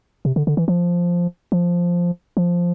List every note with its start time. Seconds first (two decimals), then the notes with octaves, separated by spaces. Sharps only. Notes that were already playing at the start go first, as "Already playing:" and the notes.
0.25 C3
0.36 D3
0.47 D3
0.57 E3
0.68 F3
1.52 F3
2.37 F3